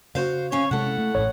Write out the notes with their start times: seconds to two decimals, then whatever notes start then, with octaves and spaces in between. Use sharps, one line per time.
0.15 C#3 F#4 C5 F5
0.51 C3 C#4 C#5 F5
0.71 C3 G#3 E4 A4 F#5
0.98 A3
1.15 A1 A2 C#5